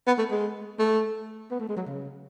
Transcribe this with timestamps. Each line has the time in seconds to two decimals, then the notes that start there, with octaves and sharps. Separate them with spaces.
0.07 B3
0.19 A3
0.31 G#3
0.79 A3
1.51 B3
1.59 A3
1.69 G#3
1.77 F#3
1.86 C#3